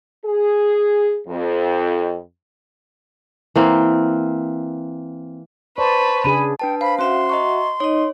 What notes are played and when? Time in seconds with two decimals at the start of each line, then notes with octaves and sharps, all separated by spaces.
0.25 G#4
1.27 F2
3.56 E3 A#3 C4
5.78 B4 C5 D5 A5 C#6
6.24 C#3 D4 G#4 B5 D#7
6.59 D4 B4 G5 A5
6.81 C5 F5 B5
6.99 C#4 F#4 C5 E5 F#5 C6
7.30 D#5 A#5 C#6
7.80 D#4 C#5 D#5